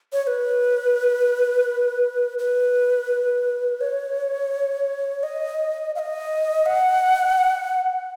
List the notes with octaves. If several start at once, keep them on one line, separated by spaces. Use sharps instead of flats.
C#5
C#5
B4
B4
C#5
D#5
F5
D#5
F#5